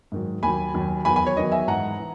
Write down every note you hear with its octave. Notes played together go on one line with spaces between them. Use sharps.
G#2 D#3 F#3
D#2 D#3 F#3 G#5 B5
D#2 D#3 F#3
E2 D#3 F#3 G#5 B5
G#5 B5
C#5
E2 D#3 F#3 D#5
E5 G#5
G#2 E3 F#5 A#5
E3